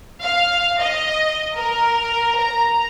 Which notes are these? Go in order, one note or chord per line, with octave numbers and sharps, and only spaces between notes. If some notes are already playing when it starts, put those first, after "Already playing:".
F5
D#5
A#4
A#5